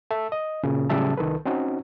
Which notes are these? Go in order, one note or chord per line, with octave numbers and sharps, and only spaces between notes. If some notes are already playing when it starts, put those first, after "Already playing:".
A4 E5
D#5
A#2 C#3
A2 C#3 F#3 G3 E5 A5
C2 D#3 A4 B4
C4 C#4 D#4 F#4